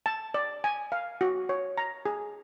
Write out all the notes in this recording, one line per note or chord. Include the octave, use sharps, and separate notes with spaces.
A5
D5
G#5
F5
F#4
C#5
A#5
G#4